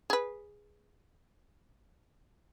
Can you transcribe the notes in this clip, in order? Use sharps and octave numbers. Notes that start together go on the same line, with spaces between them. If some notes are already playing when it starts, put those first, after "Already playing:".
G#4 B4